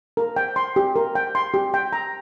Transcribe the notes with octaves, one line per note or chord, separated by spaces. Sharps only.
A#4
G5
C6
G4
A#4
G5
C6
G4
G5
A#5